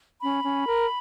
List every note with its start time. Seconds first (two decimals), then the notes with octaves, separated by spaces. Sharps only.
0.21 C#4 B5
0.43 C#4
0.65 A#4